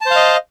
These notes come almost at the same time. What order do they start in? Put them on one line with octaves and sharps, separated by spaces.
A5 C5 F5 D#5